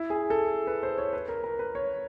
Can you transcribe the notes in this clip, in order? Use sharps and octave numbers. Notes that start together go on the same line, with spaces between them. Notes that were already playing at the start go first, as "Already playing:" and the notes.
Already playing: E4
G#4
A4
B4
C5
C#5
B4
A#4
A#4
B4
C#5